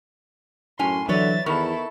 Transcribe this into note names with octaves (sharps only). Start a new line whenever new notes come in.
F#2 A2 C#4 G#5 C6
D3 E3 F#3 B4 C#5 D5 E5 A6
E2 D#3 B3 E4 A4 A#4 B5 C#6